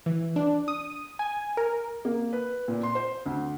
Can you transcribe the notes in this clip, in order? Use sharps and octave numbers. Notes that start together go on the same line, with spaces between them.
E3
D4
D#6
G#5
A#4
A#3
B4
A#2
C6
C5
D2